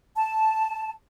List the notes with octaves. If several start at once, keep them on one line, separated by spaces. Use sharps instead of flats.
A5